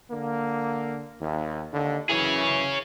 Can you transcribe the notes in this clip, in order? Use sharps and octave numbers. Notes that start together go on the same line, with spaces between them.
D3 A#3
D#2
D#2 D3
F#2 E3 E4 G#4 C#5